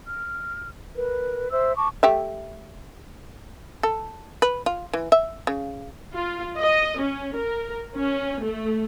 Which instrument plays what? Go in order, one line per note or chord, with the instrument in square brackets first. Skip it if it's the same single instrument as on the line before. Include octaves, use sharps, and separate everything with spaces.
[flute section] F6
A#4 B4
C5 E5 E6
A5 C#6 D6
[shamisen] A3 G4 E5
A4
B4
F4
E3
E5
C#3
[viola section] F4
D#5
C#4
A#4
C#4
A3